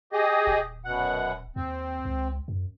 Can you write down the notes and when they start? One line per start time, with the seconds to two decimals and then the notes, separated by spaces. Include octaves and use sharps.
0.13 G4 G#4 D#5
0.47 D#1
0.85 F#2 B2 F#5
1.56 D#2 C4
2.05 C#2
2.48 F#2